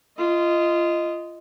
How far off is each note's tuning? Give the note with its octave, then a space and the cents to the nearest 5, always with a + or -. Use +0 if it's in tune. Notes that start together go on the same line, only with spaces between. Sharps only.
F4 -20 D#5 +0